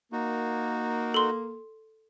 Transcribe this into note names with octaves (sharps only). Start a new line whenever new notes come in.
A#3 D#4 F#4
A4 C6